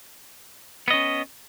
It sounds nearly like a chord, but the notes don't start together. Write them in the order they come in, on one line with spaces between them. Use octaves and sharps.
B3 D#5 C#4